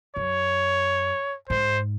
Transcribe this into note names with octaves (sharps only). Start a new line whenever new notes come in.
F#2 C#5
G#2 C5